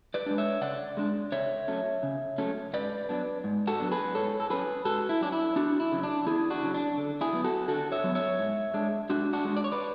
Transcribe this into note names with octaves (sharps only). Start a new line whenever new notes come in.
B4 D5
G#3 D4
C#5 E5
C#3 D5 F#5
G#3 D4
C#3 C#5 E5
F#3 A3 C#4
C#3
F#3 A3 C#4
G#2 B4 D5
F#3 B3 D4
G#2
F#4 A4
F#3 B3 D4
G#4 B4
G#2 A4 C#5
A4
F#3 C#4 G#4 B4
G#2 F#4 A4
E4
F#3 C#4 D4
E4
E2 D4 F#4
E4
C#3 F#3
D4
E2 E4 G#4
D4 F#4
C#3 F#3
D4
D3
E4 G#4
F#3 B3
F#4 A4
D3 F#4 A4
C#5 E5
F#3 B3
C#5 E5
G#2
G#3 D4
G#2 D4 F#4
D4 F#4
G#3 D4
D5
C#5
B4 D5